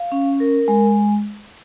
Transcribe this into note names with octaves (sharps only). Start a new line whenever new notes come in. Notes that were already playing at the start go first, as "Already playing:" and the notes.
Already playing: F5
C#4
A#4
G#3